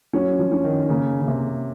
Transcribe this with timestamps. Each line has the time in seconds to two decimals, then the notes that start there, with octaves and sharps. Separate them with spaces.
0.13 F#3 C#4
0.39 F3
0.52 C#4
0.64 D#3
0.83 D#3
0.89 C#3 A#3
1.21 C#3
1.27 C3 A#3